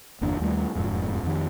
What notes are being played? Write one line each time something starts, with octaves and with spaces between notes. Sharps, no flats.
G1 E2 A#3 D4
D#2 G3 A3
E1 F2 G#2
F2 D#3